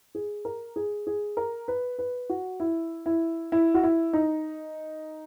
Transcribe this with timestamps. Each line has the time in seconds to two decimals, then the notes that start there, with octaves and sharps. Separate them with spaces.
0.15 G#4
0.45 A#4
0.76 G#4
1.07 G#4
1.37 A#4
1.68 B4
1.99 B4
2.29 F#4
2.60 E4
3.06 E4
3.52 E4
3.74 F#4
3.83 E4
4.13 D#4